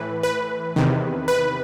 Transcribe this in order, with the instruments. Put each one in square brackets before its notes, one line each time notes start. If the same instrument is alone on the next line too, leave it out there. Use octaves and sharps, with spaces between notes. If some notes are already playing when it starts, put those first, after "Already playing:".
Already playing: [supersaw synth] A2 E3 B4
B4
E2 C3 D#3
B4